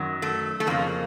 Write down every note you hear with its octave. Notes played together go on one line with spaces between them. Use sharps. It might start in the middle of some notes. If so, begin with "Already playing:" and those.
Already playing: F#2 D#3 F#3
A3
A3
F2 C#3 F3 A#3